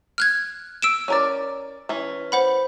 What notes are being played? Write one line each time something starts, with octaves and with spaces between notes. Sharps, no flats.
F6 F#6 G#6
E6 D7 E7
C#4 A#4 D5
E3 C#4
C5 F#5 B5